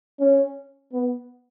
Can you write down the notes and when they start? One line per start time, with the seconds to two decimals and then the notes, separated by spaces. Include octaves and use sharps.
0.20 C#4
0.93 B3